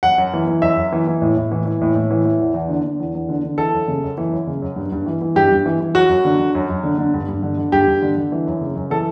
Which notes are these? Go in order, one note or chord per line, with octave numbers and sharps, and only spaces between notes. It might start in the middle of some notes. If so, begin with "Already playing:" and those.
F#2 F#5
F#2
E3
E3
F#2 E5
F#2
E3
E3
A2
A2
E3
E3
A2
A2
E3
E3
E2
E2
D3
D3
E2
E2
D3
D3
E3 A4
F#2
C#3
F#2
E3
F#2
C#3
F#2
G2
G2
E3
E3
G2 G4
G2
E3
E3
F#2 F#4
F#2
D3
D3
F#2
F#2
D3
D3
G2
G2
D3
D3
G2 G4
G2
D3
D3
E3
F#2
C#3
F#2
E3 A4